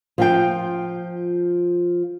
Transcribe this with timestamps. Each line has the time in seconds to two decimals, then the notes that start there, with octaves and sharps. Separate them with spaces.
0.18 F3 F4 G5